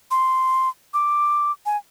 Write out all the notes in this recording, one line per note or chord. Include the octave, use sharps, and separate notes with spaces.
C6
D6
G#5